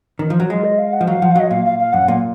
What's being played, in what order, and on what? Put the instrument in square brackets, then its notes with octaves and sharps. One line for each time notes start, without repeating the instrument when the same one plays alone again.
[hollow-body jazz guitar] D#3
F3
F#3
[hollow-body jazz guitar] G#3 [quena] F4
[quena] D#5
F5
F#5
[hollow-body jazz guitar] F3
[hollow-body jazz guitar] F#3 [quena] F5
[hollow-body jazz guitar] F3 [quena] F#5
[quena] F5
[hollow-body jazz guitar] F#3 [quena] D#5
[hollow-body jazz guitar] A#2 [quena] F5
[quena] F5
F5
[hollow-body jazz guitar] F#2 [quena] F#5
[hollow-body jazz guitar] A#2 [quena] F5